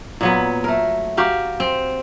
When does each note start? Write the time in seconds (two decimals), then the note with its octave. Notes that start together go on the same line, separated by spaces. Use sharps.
0.21 A#2 F#3 B3
0.64 A3 A#4
1.17 F#4 G4 A#4 F5
1.60 C4